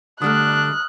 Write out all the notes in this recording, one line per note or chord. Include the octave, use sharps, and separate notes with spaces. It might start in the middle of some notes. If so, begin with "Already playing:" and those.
D3 G3 A3 D4 D#6 F6 F#6